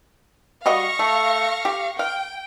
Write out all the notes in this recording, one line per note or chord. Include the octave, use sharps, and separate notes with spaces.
G3 F#4 D#5 F5 C#6 A#6
A3
G4
F5 G5